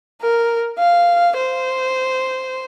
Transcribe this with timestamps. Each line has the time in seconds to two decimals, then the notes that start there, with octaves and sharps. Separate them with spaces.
0.21 A#4
0.78 F5
1.37 C5